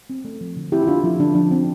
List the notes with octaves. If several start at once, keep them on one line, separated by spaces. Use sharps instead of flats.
C4
A3
F3
D3
C4 E4 G4
E4
A3 D4 F4
F3 E4
D3 D4
F3 D4
C4